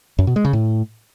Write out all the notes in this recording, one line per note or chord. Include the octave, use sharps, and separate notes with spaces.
F#2
B2
G#3
C#3
A2